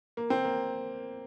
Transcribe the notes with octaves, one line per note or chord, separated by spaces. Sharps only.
A#3
C4
A#3